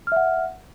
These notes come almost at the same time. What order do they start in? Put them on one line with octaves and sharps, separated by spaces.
F6 E5 F#5